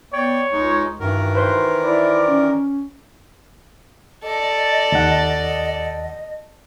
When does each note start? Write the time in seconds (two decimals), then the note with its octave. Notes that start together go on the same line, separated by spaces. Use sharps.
0.13 B3 C#5 D5 G5
0.52 C#2 G#3 D#4
1.00 G2 D#3 E3 F#4 A#4
1.35 B4 C5 C6
1.83 E4 D5
2.28 C#4
4.23 A4 D5 D#5
4.92 D#2 F#5